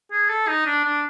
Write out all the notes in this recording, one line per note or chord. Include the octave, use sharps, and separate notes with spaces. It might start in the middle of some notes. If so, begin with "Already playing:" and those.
G#4
A4
D#4
D4
D4